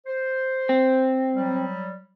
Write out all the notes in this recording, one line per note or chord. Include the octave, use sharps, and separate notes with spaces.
C5
C4
F#3 G3